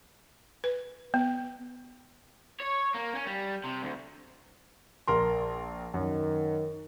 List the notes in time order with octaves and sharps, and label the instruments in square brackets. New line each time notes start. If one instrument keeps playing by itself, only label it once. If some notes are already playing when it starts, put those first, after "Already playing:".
[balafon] B4
B3
[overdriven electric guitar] C#5
A#3
C#4
G3
C3
D2
[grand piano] A#1 A#4 C6
[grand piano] F#2 [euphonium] D#3